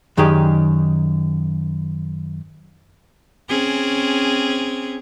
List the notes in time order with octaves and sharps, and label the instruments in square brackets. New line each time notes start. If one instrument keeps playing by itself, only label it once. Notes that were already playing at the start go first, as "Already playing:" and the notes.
[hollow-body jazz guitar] F#2 D#3 D#4 G4 G#4 D5
[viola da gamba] C4 C#4 G#4